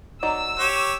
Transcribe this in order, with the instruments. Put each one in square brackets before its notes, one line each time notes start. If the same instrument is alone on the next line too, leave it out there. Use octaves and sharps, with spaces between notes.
[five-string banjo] F#3 D#4 D5 [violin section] E6
[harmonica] G4 C#5